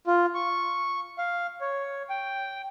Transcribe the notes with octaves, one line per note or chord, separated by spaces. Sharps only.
F4
C#6
F5
C#5
G5